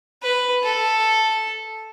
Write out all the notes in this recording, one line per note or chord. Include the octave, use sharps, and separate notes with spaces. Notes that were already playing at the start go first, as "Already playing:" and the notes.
B4
A4